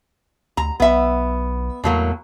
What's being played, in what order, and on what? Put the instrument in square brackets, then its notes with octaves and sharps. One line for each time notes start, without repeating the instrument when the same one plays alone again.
[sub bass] D2 [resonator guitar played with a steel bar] A#5
[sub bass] B1 [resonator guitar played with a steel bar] B3 E5
[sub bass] E2 [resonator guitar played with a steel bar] A2 F#3 A#3